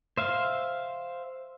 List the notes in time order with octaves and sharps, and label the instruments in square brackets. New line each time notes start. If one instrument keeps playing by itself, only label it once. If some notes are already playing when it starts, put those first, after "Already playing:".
[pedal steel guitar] C5 E5 F5